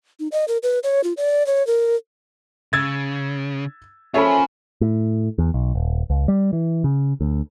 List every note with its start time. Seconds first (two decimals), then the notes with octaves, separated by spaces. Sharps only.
0.20 D#4
0.32 D#5
0.48 A#4
0.63 B4
0.83 C#5
1.04 F4
1.17 D5
1.47 C#5
1.67 A#4
2.73 C#3 E6 G#6 A6
4.14 C#4 F4 A4 C5 C#5 E5 B5
4.81 A2
5.38 E2
5.54 B1
5.75 D#1
6.10 C#2
6.28 G3
6.53 E3
6.84 C#3
7.21 D2